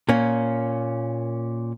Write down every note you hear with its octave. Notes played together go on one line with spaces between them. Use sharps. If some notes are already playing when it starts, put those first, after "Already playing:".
A#2 A#3 C#4